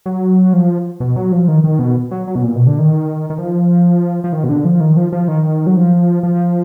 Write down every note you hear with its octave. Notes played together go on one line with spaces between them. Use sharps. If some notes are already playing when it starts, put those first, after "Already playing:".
F#3
F3
B2
F#3
F3
D#3
D#3
B2
F#3
F#3
B2
A#2
B2
D3
D#3
D#3
F3
F3
D#3
B2
D3
F3
D#3
F3
F3
D#3
F#3
F3
F3